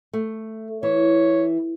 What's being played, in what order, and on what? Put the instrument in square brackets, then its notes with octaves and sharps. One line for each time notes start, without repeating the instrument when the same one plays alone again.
[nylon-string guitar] A3
[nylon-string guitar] E3 [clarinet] C#5